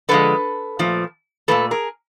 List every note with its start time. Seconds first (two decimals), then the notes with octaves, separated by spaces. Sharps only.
0.09 D3 F3 G#3 A4 B4
0.79 A#2 F3 A3
1.48 A#2 F3 A3 A4 B4
1.71 G#4 A#4